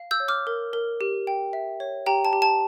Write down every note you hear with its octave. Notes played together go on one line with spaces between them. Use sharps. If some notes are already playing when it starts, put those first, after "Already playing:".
Already playing: F5
E6 G6
C#5
D6 F6
A#4
A#4
G4
G5
E5
C#5
G4 G5 A#5
A5
G4
A5